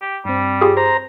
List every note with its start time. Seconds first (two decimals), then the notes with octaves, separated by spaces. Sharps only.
0.02 G4
0.25 G2 G3 C4
0.61 F4 G4 G#4
0.77 C5 A#5